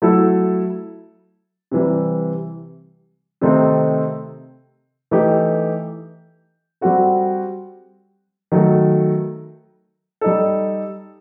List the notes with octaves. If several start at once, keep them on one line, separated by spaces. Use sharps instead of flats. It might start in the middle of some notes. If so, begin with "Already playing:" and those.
F#3 A3 E4 A4
C3 E3 G3
C3 D#3 A3 C4 D#4
E3 A3 D#4 G4
G3 C4 F#4 A4
D#3 F#3 A3
G3 D#4 A4